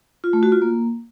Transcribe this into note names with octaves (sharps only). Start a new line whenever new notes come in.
F4
A3
F#4
F4
A#3